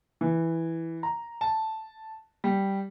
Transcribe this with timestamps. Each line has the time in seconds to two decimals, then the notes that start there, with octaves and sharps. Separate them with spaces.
0.21 E3
1.03 A#5
1.41 A5
2.44 G3